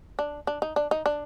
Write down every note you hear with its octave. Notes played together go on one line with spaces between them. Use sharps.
D4
D4
D#4
D4
D#4
D4